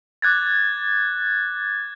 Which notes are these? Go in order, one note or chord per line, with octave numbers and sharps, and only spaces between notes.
D6 F#6 G#6 A6